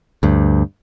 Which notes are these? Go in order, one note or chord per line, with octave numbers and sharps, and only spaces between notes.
D2 G2